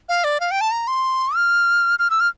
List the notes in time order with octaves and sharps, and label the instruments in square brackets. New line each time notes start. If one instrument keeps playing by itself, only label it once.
[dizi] F5
D5
F5
G5
A5
A#5
C6
F6
F6
E6
F6